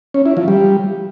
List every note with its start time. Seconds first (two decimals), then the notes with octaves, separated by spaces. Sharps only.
0.14 C#4
0.26 E4
0.37 F3
0.48 G3